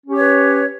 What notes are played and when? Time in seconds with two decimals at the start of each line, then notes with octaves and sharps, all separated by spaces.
0.06 C#4
0.10 G4
0.15 C#5
0.19 B4